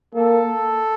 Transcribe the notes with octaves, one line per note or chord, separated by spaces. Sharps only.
A#3 A4